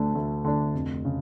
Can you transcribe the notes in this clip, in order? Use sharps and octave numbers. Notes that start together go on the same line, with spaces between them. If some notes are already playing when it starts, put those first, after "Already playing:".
Already playing: D2 D3 A3 D4
D2
D3 A3 D4
F1
C#3